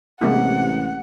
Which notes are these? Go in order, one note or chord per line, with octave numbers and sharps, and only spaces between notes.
A1 C3 G#3 A#3 E4 F#5